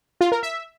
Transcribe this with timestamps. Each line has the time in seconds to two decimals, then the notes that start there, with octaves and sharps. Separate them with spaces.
0.21 F4
0.32 A#4
0.43 E5